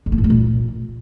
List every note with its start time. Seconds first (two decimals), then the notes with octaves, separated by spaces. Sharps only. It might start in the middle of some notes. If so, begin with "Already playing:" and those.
0.06 D3
0.12 A#3
0.18 A2
0.24 A3
0.30 A#2